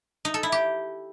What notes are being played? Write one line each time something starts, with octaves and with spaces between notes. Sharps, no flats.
D#4
A4
E4
G4